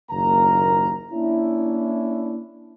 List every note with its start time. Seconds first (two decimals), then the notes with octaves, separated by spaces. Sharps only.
0.10 F#1 D#2 A#3 A#4 A#5
1.13 A#3 C#4 D4 E4